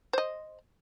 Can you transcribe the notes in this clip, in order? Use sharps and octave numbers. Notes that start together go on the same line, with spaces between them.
C5 D#5